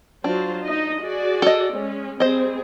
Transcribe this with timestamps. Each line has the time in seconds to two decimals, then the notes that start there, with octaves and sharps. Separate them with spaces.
0.24 F#3 D4 F4 C5
0.65 D#4 D#5
1.02 F#4 G#4 D5
1.42 A4 D#5
1.73 G#3 C#4
2.20 G3 C4 G#4 C5 D#5